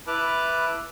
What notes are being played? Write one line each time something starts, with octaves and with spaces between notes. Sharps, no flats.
E4 B4 A5 D6 F6 F#6